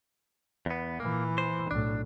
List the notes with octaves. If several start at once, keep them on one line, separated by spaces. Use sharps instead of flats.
E2 B3
A#2 E3 A#3
C5
B1 A2 D4